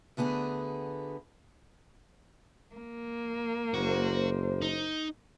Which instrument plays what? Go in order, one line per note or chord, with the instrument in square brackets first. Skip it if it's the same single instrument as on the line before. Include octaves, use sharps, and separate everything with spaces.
[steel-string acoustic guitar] D2 D3 B3 G#4
[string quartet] A#3
[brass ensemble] F#1 C5 [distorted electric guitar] F#4
[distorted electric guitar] D#4